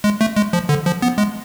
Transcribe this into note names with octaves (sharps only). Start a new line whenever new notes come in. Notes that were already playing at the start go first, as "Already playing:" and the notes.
G#3
A3
G#3
F3
D3
F3
B3
G#3